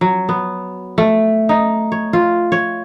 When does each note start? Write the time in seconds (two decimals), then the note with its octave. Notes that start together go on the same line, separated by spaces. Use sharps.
0.01 F#3
0.29 B3
0.98 A3
1.49 D#4
1.92 C#5
2.13 F4
2.52 C#5